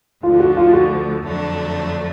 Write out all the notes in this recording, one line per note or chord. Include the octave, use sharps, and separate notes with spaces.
D2 D3 F3 F4
F#4
F4
F#4
F2 D3 F#3 A3 D4